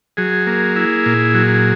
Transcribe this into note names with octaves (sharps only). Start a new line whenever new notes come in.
F#3 G#4
A#3
E4
A#2
F#3